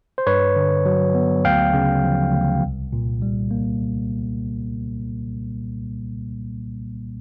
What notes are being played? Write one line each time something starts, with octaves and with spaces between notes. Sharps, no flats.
C5
G2 B4 C#5
D3
F#3
B3
D2 F5 G5
C#3
F3
D2
C2
A#2
G3
A#3